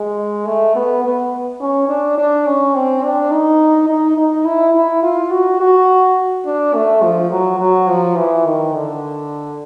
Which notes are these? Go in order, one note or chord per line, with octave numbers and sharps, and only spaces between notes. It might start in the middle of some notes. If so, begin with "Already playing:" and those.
Already playing: G#3
A3
B3
B3
C#4
D4
D4
C#4
C4
D4
D#4
D#4
D#4
E4
E4
F4
F#4
F#4
D4
A3
F3
F#3
F#3
F3
E3
D#3
D3